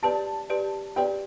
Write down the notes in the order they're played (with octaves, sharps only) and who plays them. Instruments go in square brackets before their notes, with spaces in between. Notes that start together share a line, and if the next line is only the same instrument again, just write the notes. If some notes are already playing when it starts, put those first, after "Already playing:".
[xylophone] G4 B4 D5 [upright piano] A5
[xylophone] G4 B4 D5
[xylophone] G4 B4 D5 [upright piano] G5